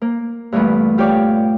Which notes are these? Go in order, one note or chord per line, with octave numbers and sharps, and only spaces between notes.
A#3
G2 A#2 E3 A3 B3
F4 G4 C#5 D5 D6